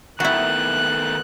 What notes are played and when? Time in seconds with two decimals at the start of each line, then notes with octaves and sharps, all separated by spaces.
0.20 D#3 A3 B3 E4 F#4 F#6